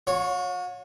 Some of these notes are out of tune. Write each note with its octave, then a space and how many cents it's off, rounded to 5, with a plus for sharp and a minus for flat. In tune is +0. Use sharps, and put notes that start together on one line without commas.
F#4 -45 C#5 +0